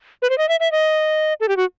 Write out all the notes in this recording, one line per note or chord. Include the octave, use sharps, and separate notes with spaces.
B4
C5
D#5
E5
E5
D#5
A4
G4
F#4